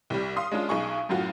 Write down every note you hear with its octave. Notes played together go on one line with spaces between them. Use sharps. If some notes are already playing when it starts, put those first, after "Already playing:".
C2 G3
F5 C6 D#6
G#3 C#4 D4 F4
B1 D#4 G#4 C#6
F#2 A2 F4 F#4